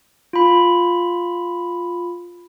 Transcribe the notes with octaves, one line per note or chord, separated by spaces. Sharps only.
F4 B5